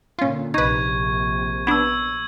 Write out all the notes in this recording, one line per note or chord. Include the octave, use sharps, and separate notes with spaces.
A#2 D3 C#4 F4
A#1 C3 D#4 B4 C#6 G#6
B3 D4 E6 G#6